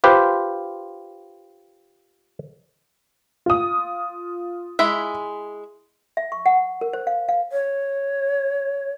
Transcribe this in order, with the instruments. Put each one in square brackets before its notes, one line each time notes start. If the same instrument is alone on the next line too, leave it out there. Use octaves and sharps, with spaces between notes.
[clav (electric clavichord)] F4 G4 B4 C5
[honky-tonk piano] F4 D#6
[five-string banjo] G#3 E4 E5
[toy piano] E5
C#6
F#5
A#4
C5
F5
F5
[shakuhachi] C#5